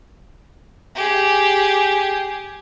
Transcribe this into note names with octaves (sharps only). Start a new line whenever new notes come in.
G4 G#4